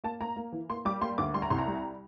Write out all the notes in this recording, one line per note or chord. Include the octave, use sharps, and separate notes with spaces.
A#3 A5
A#3 A#5
A#3
E3
A#3 C6
G3 D6
A#3 C6
D2 D6
G3 C6
A#5
C2 C6
A#5
G3